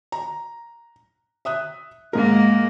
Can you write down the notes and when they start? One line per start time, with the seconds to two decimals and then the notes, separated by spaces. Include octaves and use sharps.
0.12 A#5
1.45 E5 D#6 F#6
2.13 G#2 G#3 A#3 A#4